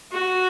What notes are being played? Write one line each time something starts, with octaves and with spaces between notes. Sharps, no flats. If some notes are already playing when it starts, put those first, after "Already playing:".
F#4